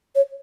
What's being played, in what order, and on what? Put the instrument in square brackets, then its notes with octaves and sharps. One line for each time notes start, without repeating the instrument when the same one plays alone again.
[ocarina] C#5